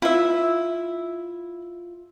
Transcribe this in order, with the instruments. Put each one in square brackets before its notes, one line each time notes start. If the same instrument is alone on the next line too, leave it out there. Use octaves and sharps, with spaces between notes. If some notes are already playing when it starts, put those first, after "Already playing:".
[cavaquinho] E4 E5 [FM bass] F4